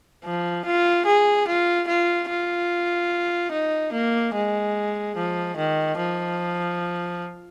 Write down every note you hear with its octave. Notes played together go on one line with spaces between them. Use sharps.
F3
F4
G#4
F4
F4
F4
D#4
A#3
G#3
F3
D#3
F3